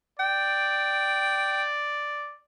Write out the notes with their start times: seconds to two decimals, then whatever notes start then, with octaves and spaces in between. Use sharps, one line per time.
0.19 D5 G5